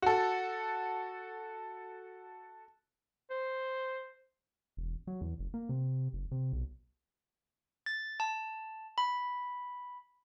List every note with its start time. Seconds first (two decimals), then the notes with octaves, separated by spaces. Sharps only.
0.02 F#4 A4
3.30 C5
4.77 E1
5.07 F#3
5.21 E2
5.39 F#1
5.54 A#3
5.69 C3
6.13 F#1
6.31 C3
6.53 B1
7.86 A6
8.20 A5
8.98 B5